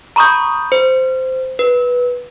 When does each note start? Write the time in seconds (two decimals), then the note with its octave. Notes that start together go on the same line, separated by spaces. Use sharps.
0.16 A#5 B5 C#6 D#6 G6
0.72 C5
1.59 B4